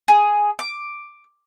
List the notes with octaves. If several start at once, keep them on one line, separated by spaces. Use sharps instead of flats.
G#4
D6